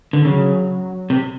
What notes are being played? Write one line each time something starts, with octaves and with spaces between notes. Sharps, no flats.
D3
C#3 F#3
C3